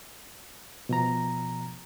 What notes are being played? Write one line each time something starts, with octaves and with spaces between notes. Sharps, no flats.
B2 F3 A#5